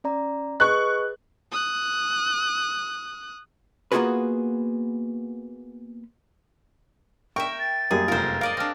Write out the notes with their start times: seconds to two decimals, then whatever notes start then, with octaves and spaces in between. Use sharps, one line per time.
0.04 C#4 D5 A#5
0.60 G#4 B4 D#5 C#6 F#6
1.51 D#6 F#6
3.92 A#3 B3 F4 F#4 G#4 B4
7.36 A#4 E5 G5 C#6
7.59 A6
7.91 F#2 G3 A#3 G#4
8.08 F1 F4 A#4 C5
8.41 A#4 D5 D#5 F5
8.57 C4 D4 F6